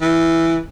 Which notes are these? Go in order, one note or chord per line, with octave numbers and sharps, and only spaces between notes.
E3